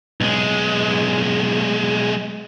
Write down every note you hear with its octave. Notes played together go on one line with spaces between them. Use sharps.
B1 G#3